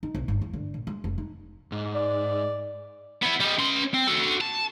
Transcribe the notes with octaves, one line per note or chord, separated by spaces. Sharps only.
D#4
B1
G1
E2
D3
A#2
G#3
F1
D#4
G#2
D5
B3 E4
G3 D#5
C#4 C6
C4
F#4 A4
A5